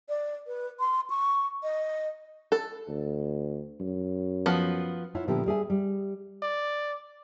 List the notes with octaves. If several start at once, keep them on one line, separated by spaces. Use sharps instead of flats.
D5
B4
C6
C#6
D#5
A4
D2
F#2
F3 B3
E4 F4 C#5 F#5
A#2 D3 F3 B3 E4 G4
G3 G#4 E5 G#5
G3
D5